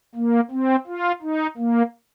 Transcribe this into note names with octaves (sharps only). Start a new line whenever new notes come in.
A#3
C4
F4
D#4
A#3